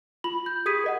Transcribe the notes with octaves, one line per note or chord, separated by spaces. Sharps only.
F4 B5 F#7
G6
G4 G#4 D#6 G#6 B6 D#7
A#4 D#5 F#5